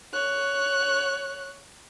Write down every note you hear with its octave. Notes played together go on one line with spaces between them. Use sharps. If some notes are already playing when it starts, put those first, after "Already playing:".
C#5 F#6